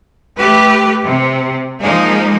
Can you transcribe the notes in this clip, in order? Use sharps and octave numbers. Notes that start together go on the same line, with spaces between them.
A3 G4 B4
C3
F3 G#3 A#3 D#4